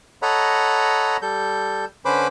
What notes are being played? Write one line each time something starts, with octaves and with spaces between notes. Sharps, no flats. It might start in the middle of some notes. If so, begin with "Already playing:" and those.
A4 C#5 D#5 F#5 A#5 B5
G3 A4 G6
D3 C#4 B4 C5 B5 D6